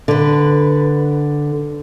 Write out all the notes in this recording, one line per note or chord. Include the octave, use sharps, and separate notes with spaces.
D3 B4